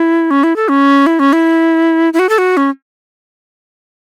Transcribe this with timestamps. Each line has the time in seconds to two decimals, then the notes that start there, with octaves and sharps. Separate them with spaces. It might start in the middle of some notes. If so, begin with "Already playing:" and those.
Already playing: E4
0.31 C#4
0.43 E4
0.56 A4
0.69 C#4
1.06 E4
1.19 C#4
1.33 E4
2.13 E4
2.19 F#4
2.29 A4
2.38 F#4
2.57 C#4